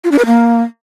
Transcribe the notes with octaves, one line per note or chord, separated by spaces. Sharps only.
F4
D4
B4
A#3